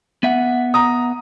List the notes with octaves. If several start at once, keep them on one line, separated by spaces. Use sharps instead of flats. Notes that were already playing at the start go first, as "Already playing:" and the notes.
B3 E5 F#5
A#5 D#6